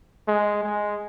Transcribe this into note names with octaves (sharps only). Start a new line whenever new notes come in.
G#3
G#3